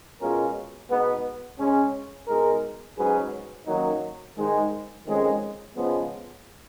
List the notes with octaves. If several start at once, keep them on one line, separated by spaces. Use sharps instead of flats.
B2 G#3 C#4 F4 A#4
B2 G#3 B3 D#4
C#3 G#3 C#4
B2 G#3 D#4 A#4
G#2 F#3 C#4 G#4 B4
F#2 D#3 F#3 A#3 D#4
G#2 D#3 G#3 D#4
F2 D#3 G#3 C#4
C#3 F3 G#3 B3